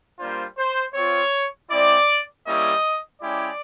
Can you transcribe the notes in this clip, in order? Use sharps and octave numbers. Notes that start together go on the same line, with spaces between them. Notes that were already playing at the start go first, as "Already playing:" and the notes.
G3 A#3 D4 F4 C5
C5
C4 F4 C#5
G#3 C4 E4 D5
G3 A#3 C#4 E4 G4 D#5
G#3 C#4 E4 G4 D5